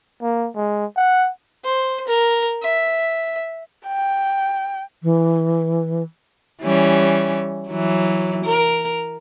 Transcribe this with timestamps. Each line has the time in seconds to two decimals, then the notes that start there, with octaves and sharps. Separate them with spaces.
0.22 A#3
0.55 G#3
0.96 F#5
1.64 C5
2.07 A#4
2.62 E5
3.87 G5
5.03 E3
6.63 E3 G3 C#4
7.68 E3 F#3
8.45 A#4